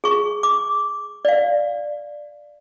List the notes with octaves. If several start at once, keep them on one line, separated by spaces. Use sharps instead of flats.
G#4 C#6
D6
D5 F5